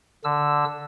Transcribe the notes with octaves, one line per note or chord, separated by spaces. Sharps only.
D3 E6